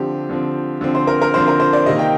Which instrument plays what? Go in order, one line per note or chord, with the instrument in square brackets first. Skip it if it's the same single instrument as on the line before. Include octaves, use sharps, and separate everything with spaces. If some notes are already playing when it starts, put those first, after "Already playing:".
Already playing: [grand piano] D3 F3 C4 G4
D3 F3 C4
D3 F3 C4
C5
A#4
A#4
D3 F3 C4 C5
A#4
C5
D5
C3 D#3 A#3 D#5
G5